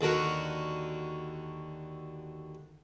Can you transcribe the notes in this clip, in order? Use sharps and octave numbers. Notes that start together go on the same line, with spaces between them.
D#2 D3 F#4 A#4